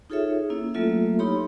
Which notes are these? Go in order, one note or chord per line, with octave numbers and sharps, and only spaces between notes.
D#4 F4 G#4 A4 C#5 E5
A#3 C#4 E4
F#3 A3 A#3 F4 A4 E5
D#4 E4 G4 C#5 B5 C6